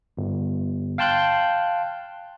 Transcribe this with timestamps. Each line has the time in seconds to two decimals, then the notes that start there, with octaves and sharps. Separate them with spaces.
0.17 G1
0.98 F5 G5 A5 C6 F#6 G6